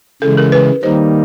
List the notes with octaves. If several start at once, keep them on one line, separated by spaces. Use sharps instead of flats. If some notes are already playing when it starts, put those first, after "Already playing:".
C#3 E3 G#3 A4
A#4
B4
D#3 G3 A#3 D#4 C5